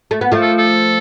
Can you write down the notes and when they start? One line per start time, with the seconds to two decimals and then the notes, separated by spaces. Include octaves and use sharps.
0.11 A3
0.21 B3
0.32 F3 A3
0.42 A4
0.58 A4